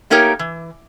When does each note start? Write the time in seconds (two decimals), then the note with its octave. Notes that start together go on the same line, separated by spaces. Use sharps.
0.10 A3 A#3 D#4 G4 A#4 C#5
0.39 E3